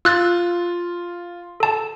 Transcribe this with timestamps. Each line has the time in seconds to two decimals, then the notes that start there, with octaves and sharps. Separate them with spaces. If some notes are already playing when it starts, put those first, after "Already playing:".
0.05 F4 E6 F#6 A6
1.60 A4 A5